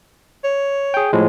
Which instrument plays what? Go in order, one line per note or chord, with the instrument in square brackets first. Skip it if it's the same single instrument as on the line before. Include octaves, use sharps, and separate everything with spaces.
[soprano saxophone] C#5
[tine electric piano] G#4 G5
A2 F3 G#3